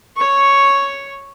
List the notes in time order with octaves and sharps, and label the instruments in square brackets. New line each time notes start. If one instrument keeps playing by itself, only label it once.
[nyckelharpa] C#5 C#6